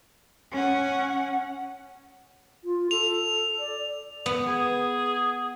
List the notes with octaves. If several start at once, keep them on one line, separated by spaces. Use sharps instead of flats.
C#4 F#5
F4
A4 F7
D5
B3
G#4